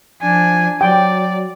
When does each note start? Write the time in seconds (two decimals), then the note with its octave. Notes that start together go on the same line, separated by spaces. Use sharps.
0.21 F3 D4 G#5
0.81 F#3 D5 G5